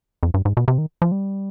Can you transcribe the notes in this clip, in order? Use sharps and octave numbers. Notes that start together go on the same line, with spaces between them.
F2
G2
G#2
B2
C3
D#3
F3
G3